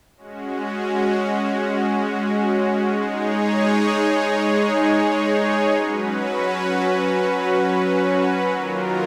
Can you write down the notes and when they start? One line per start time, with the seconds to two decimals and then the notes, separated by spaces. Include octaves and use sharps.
0.17 G#3 C#4 F#4
2.95 G#3 D#4 G#4 C#5
5.73 F#3 C#4 F#4 B4
8.51 D#3 F#3 A#3 F4 A#4